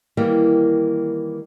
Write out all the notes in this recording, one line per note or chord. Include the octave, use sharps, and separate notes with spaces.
D#3 E3 G3 A#3 A#4